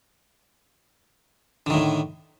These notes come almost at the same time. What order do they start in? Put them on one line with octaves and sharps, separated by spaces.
D3 D#3 A2